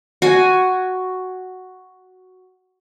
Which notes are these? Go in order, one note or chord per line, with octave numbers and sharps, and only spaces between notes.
F#4 G#5